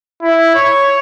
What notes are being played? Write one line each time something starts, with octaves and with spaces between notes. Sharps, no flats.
E4
C#5